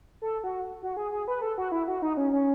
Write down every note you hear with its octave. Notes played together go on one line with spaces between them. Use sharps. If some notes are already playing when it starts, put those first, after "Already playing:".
A4
F#4
F#4
G#4
G#4
B4
A4
F#4
E4
F#4
D#4
C#4
C#4